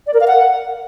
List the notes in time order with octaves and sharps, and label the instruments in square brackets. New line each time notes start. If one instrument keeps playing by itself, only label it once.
[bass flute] D5
A#4
F5
F#5